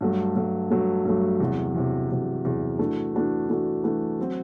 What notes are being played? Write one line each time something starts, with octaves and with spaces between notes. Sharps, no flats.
G2 F#3 A3
G2 F#3 A3
G2 F#3 A3
G2 F#3 A3
E2 C3 F#3
E2 C3 F#3
E2 C3 F#3
E2 C3 F#3
E3 A3 D4 F#4
E3 A3 D4 F#4
E3 A3 D4 F#4
E3 A3 D4 F#4
F#3 C4 F#4